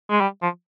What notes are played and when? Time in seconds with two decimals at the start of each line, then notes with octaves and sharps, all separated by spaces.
0.11 G#3
0.21 G3
0.42 F3